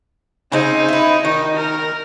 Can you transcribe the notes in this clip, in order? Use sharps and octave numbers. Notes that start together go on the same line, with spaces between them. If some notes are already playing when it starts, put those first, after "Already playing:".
C#3 C4 D#4 G#4
E4 B4
D#3 D#4
A#4